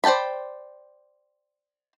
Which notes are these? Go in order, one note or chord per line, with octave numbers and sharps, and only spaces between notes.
C5 D5 G5 A5 B5